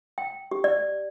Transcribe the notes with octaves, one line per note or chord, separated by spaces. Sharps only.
G5
G4
D5